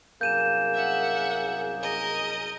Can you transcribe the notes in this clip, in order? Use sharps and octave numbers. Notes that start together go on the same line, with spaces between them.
C2 F#2 A#3 G#4 G6 D#7 E7
E5 F#5
A#4 D#5